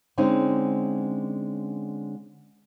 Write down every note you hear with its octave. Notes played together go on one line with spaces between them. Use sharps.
D3 G#3 C4 C#4 D#4